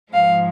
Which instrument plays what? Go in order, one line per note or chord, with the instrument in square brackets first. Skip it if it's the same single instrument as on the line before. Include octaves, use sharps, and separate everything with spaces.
[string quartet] G#2 F3 G#3 F5